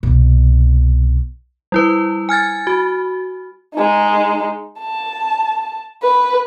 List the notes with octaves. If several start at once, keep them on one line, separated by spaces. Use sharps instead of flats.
C2 B2
G3 E4 B4
G#5 F6 G#6 A6
F#4
G#3 D#4
A5
B4